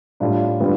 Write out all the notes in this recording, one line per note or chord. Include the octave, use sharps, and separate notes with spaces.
A2 G3 D4 F4
D3 G3 B3 F4